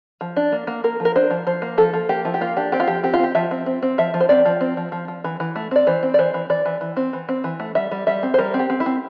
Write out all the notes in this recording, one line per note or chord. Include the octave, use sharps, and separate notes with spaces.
F3
D4
A#3
A#3
A#3 A#4
F3
A#4
D4 C5
F3
F3 C5
A#3
F3 A4
F3
A#3 G4
F3 E4
G4
A#3 F4
D4 G4
C4 G4
F4
F3 G4
C4 G4
F4
C4 G4
F3 E5
C4
C4
C4
F3 E5
F3
C5
C4 D5
F3
C4
F3
F3
F3
E3
E3
A3
C4 D5
E3 C5
C4
D5
E3 C5
E3
E3 D5
E3
E3
C4
E3
C4
E3
A3
G3 E5
G3
G3 E5
C4
C5
G3 A#4
C4
G4
C4
E4
C4